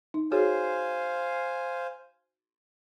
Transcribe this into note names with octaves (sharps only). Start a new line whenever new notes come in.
D#4
F#4 G#4 C5 C#5 F5 G#5